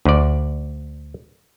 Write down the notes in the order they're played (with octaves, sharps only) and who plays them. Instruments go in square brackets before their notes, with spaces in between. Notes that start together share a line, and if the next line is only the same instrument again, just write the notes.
[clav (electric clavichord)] D2 D5